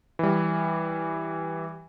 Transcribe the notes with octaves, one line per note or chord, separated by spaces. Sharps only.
E3 G3